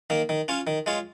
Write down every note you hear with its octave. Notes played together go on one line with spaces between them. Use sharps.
D#3 A#3
D#3
C#4 F4 C#5
D#3
G#3 F4 C#5